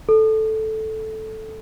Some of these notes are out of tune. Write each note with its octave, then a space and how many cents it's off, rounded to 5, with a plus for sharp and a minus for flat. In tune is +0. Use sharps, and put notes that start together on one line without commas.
A4 -5